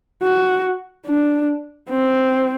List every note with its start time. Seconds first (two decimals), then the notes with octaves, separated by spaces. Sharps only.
0.23 F#4
1.07 D4
1.90 C4